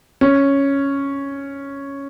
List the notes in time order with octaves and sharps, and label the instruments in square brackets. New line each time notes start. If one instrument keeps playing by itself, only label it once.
[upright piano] C#4